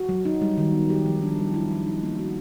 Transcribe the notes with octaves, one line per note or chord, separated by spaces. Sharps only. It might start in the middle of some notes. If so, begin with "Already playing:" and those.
Already playing: F#4
F#3
D#4
G3
D#3
B3
G4
F3
D4
G3
E4
F3
D#4
A#3
F#4